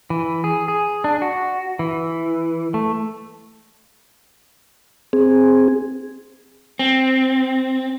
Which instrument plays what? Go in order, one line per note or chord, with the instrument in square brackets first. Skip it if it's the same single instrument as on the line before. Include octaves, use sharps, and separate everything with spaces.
[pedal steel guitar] E3
G#4
G#4
D4
F#4
E3
A3
[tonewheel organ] C4 G#4
[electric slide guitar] C4